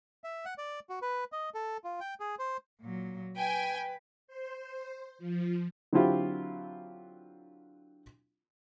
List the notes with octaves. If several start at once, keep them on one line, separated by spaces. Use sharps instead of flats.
E5
F#5
D5
F#4
B4
D#5
A4
F4
G5
G#4
C5
A#2 F#3
B4 G5 G#5
C5
F3
D3 F#3 C4 E4 F4 G4